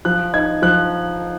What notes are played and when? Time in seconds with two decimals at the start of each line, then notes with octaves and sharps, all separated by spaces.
0.05 F3 F#6
0.33 D#4 G#6
0.62 F3 F#6